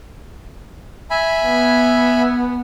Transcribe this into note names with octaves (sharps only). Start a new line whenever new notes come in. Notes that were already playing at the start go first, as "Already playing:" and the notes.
E5 G#5 B5
B3